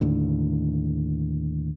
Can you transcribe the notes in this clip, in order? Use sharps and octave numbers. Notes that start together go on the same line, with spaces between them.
D#2 A2 D3